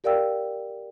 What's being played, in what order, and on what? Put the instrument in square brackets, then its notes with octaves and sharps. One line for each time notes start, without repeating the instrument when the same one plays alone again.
[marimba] G4 A#4 D5 F5 G5 E6